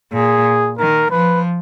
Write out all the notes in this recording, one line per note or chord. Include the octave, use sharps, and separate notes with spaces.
A#2 G#4
D#3 A#4
F3 B4